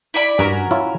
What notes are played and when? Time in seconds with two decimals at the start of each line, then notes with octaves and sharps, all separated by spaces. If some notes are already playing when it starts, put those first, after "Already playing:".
0.14 E4 D5 B5
0.39 G2 C#4 F#4 A#4
0.71 E4 F4 C#5